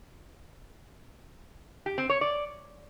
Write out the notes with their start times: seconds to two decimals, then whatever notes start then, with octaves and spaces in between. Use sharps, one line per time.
1.86 G4
1.98 C4
2.09 C#5
2.21 D5